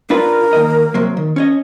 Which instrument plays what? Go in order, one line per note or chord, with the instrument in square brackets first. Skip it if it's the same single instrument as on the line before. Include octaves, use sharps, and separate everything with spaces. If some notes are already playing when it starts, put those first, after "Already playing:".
[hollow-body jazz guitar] D4 F4 B4 [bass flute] A#4
[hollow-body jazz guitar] D#2 B2 D#5
C3 F#3 A#3
D#3
C#4 C#5 D#5